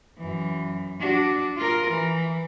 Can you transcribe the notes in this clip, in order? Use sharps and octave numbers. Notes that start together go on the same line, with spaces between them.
F#2 E3
D4 F#4
F4 A#4
E3